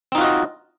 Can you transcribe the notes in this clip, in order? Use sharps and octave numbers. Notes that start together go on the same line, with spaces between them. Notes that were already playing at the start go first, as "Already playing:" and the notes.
C4 D#4 F4 F#4 D#5